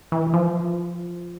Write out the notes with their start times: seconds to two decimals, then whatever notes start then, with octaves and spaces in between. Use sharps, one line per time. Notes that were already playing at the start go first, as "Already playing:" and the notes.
0.12 E3
0.33 F3